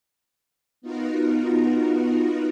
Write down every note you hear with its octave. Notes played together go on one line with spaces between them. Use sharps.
B3 D#4 F4 F#4 A#4